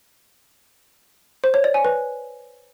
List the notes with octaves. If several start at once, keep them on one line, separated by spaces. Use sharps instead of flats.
C5
C#5
D5
G#5
B4